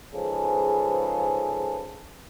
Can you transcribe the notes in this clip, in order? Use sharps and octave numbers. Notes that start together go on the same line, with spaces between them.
G#2 C#3 F3 G#4 A4 B4